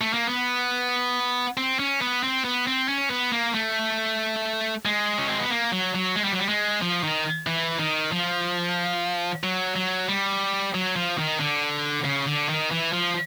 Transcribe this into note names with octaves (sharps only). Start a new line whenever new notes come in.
A3
A#3
B3
C4
C#4
B3
C4
B3
C4
C#4
B3
A#3
A3
G#3
C#4
C4
B3
A#3
F#3
F#3
G#3
G3
F#3
G3
G#3
F3
D#3
E3
D#3
F3
F#3
F#3
G3
F#3
F3
D#3
D3
C#3
D3
D#3
E3
F3